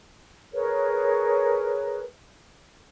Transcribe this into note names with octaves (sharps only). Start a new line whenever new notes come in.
G#4 A#4 B4 C#5